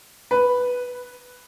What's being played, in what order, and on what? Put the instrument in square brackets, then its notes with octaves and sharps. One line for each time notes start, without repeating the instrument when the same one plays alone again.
[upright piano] B4